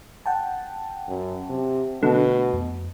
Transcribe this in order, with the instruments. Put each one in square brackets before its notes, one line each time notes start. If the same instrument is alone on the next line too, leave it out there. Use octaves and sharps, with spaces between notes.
[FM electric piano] F#5 G5 A5
[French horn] F#2
C3
[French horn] B2 [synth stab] D3 [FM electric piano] A3
[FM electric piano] F2